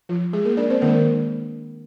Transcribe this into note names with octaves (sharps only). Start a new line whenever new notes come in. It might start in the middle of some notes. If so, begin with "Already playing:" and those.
F3 F4
G#3 G#4
A#3 A#4
D4 D5
C4 C5
D#3 G#3 A#3 D4 A#4